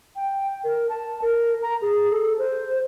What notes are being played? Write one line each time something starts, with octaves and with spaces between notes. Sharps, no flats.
G5
A#4
A5
A#4
A#5
G#4
A4
C5